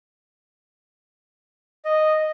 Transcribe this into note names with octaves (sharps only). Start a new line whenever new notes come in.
D#5